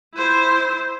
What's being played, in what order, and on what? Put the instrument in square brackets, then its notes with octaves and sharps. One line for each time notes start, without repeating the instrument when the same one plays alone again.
[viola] E4 C5